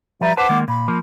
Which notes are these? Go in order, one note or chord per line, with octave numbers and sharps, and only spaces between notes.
F3 G3 B4 E5 A#5
B4 C5 F#5 A5 D6
D#3 G#3 A#3
A#2 B5
F3 A#3